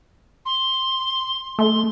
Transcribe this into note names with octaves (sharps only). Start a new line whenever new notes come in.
C6
A3 C6